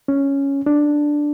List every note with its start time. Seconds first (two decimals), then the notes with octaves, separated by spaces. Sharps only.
0.08 C#4
0.66 D4